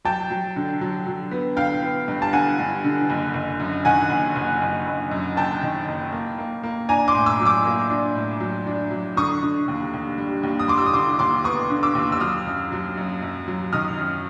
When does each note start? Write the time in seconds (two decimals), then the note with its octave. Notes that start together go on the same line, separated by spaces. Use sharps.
0.05 F#3 G5 A5
0.30 F#3
0.56 D3
0.81 F#3
1.07 F#3
1.31 B3
1.57 D3 F5 G5
1.82 B3
2.08 G2
2.22 A5
2.33 D3 F#5 G#5
2.59 G2
2.84 D3
3.10 F#1
3.34 F#1
3.60 F#2
3.85 D#3 F#5 G#5
4.10 F#1
4.35 F#1
4.62 F#1
4.87 F#1
5.11 F#2
5.36 F#1 G5 A5
5.63 D#3
5.88 F#1
6.12 A#3
6.38 A#3
6.63 A#3
6.89 D4 G#5 A#5
7.08 C6 D6
7.15 A2
7.26 D6 E6
7.40 F#3
7.45 D6 E6
7.65 A#3
7.90 D4
8.15 A2
8.40 F#3
8.67 D4
8.91 F#3
9.17 D3 C#6 D#6
9.43 D3
9.68 D#2
9.93 D#2
10.18 G3
10.43 D#2
10.59 D#6
10.68 G3 C6 D6
10.78 E6
10.86 D#6
10.94 D3 C6 D6
11.19 D#2 C6 D6
11.44 B3 C#6 D#6
11.70 D3
11.83 D6 E6
11.95 D#2
12.12 E6
12.20 F#3 D#6 F6
12.45 F#2
12.72 F#3
12.97 F#2
13.22 F#2
13.48 F#3
13.73 D#3 D#6 F6
13.97 F#2